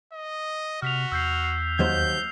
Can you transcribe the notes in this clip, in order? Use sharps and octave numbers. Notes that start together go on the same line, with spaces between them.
D#5
C3 F#4 F6 B6 F7
E2 E6 G6 C7
C7
D#2 F#3 C5 G6